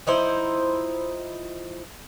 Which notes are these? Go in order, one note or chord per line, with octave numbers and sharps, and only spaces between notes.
F3 D#4 E4 C5